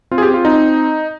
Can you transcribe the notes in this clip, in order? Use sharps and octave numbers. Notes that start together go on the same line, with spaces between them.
C4 F4
G#4
G4
C4
F4
C4 D#4